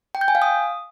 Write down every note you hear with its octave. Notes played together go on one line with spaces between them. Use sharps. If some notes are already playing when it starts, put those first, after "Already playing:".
G5
G6
G#5
F5
D#6